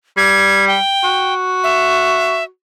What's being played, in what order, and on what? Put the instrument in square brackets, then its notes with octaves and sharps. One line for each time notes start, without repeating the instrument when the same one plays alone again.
[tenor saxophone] G3 [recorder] G#6
[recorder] G5
[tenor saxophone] F#4
[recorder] E5